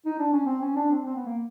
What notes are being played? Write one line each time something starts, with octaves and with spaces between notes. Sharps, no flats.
D#4
D4
C#4
C4
C#4
D4
C4
C4
B3
A#3